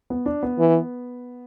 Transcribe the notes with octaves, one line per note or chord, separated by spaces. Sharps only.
B3
D4
B3
E3